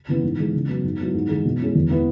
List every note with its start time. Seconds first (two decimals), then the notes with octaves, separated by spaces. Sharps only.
0.08 C#3 E3 B3 E4
0.23 G#2
0.38 E3 G#3
0.54 C#3
0.69 F#3 B3
0.84 G#2
1.00 F#3 B3 E4
1.14 G#2
1.29 E3 G#3
1.45 B2
1.60 G#3 C#4 E4
1.75 E2
1.90 E3 B3 E4